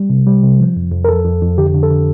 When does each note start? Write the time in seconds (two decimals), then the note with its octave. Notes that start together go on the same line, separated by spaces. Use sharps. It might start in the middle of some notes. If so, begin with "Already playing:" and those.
Already playing: G3
0.10 C3
0.27 G3
0.43 C3
0.60 F3
0.77 F2
0.92 F2
1.05 A#4
1.09 F2 A4
1.25 F2
1.41 F2
1.58 D3 G4
1.74 D3
1.83 A4
1.90 D3